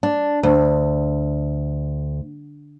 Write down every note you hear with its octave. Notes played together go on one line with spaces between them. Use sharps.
D4
D2